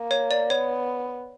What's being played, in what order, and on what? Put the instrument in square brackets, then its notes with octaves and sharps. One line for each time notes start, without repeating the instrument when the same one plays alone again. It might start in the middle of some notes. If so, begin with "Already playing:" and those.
Already playing: [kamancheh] A#3
[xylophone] C#5
D5
[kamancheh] B3 [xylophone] C#5